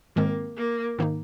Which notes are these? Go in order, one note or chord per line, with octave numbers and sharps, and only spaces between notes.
G#2 D#3 G#3 A#3 C4
A#3
G#2 D#3 A#3 D#4